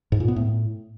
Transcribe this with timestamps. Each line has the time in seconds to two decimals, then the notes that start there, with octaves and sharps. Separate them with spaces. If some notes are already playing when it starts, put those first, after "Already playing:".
0.12 G#2
0.20 A#2
0.28 B3
0.36 A2